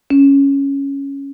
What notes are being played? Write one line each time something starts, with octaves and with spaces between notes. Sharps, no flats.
C#4